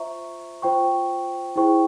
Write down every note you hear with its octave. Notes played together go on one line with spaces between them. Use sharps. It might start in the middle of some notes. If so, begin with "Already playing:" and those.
Already playing: F4 C5 E5 A#5 C#6
F4 C5 G5 C#6
E4 G#4 C5 G5 C#6